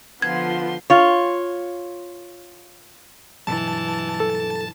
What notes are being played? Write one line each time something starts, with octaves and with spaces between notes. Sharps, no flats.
D3 F3 B3 F4 C6 G#6
F4 C#5
G2 B2 E3 F#3 A5
A4